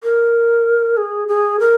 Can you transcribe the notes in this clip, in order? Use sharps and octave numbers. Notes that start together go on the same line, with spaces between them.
A#4
G#4
G#4
A#4